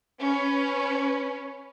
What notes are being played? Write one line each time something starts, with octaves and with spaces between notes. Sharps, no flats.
C#4 B4